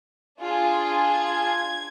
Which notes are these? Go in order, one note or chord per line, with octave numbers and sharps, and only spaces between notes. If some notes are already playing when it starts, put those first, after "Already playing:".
D4 F4 G#4
G#6